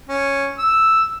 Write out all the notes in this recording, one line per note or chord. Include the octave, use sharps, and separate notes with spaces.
C#4
E6